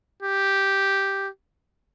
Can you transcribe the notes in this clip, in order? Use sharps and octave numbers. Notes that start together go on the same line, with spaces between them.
G4